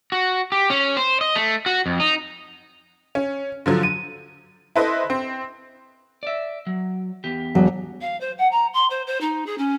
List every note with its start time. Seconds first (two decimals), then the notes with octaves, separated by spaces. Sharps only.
0.12 F#4
0.52 G4
0.70 C#4
0.97 C5
1.21 D#5
1.35 A3
1.66 F#4
1.86 F2
2.00 D#4
3.15 C#4
3.66 D3 F3 F#3
3.83 D#7
4.76 E4 A4 B4 C5 D#5
5.10 C4
6.23 D5 E5
6.67 F#3
7.24 E2 G4
7.55 E1 F#3
8.01 F5
8.20 C5
8.38 F#5
8.51 A#5
8.74 C6
8.90 C5
9.07 C5
9.21 D#4
9.46 G#4
9.58 C#4